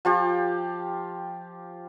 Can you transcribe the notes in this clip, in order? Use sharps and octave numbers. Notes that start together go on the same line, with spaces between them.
F3 F4 G4